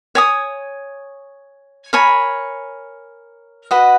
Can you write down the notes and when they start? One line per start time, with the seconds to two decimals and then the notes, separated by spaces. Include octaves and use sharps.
0.15 C#5 G#5 D#6
1.93 A#4 C#5 G#5 B5
3.71 F#4 B4 D#5 F#5